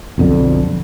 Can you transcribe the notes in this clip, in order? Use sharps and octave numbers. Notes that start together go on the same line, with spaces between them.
B1 F2 D3